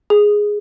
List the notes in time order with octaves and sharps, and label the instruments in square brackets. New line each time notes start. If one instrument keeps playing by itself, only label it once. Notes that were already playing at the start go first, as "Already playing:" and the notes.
[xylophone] G#4